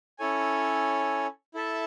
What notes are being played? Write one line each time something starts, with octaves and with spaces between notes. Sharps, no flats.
C#4 E4 A4 C#5 G#5
E4 A4 E5 A5